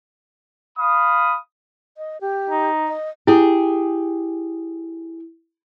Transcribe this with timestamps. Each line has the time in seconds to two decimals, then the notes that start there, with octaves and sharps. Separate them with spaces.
0.77 F5 B5 D#6
1.97 D#5
2.21 G4
2.50 D#4
2.88 D#5
3.27 E4 G4 G#4